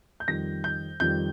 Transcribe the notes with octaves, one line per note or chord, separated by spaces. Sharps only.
G6
F2 D#3 G3 A#6
G6
F2 D#3 G3 G6